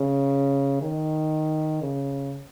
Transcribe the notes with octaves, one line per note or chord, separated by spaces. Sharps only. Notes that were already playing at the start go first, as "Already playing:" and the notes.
Already playing: C#3
D#3
C#3